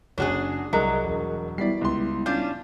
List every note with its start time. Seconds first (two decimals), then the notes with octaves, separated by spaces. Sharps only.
0.18 F#1 C#4 D4 F#4 G#4 C#5
0.73 C2 F#3 G#4 A#4 D#5
1.04 E1
1.58 G3 B3 E4 D5 B6 C7
1.81 C#2 C6
2.26 C#4 D4 F4 G6